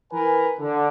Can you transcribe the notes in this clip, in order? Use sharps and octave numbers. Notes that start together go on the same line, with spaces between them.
E3 A#4 B4 G#5
D3